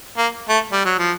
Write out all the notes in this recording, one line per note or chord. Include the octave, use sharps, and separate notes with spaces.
A#3
A3
G3
F#3
F3